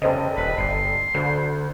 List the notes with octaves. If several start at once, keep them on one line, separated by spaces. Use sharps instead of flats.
F1 C#3 C5 D#5
D#1 B4
G1 C6
D2 D3